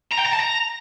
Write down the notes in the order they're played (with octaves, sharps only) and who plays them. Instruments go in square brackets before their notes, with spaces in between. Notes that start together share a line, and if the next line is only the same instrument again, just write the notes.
[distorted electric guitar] A#5
G5
A#5
A5
A#5